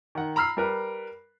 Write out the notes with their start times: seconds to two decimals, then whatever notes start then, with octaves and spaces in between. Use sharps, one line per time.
0.15 D#3 F#5
0.36 A#5 B5 E6 F6 C7
0.57 G3 A#4 B4